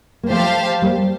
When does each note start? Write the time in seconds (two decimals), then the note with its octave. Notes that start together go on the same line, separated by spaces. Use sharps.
0.23 A#3
0.30 F3 A3 G4 C5 F5 A5
0.82 G3 A#3